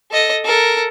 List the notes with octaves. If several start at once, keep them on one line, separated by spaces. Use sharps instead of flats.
A4 D#5
A4 A#4